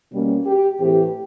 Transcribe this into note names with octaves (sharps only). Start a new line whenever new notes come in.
B2 G3 A#3 C#4
G4
A2 E3 A3 C4 G4